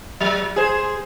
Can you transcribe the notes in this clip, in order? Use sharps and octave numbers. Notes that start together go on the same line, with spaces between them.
F#3
G#4 C5